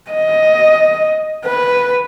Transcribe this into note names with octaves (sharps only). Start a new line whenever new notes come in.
D#5
B4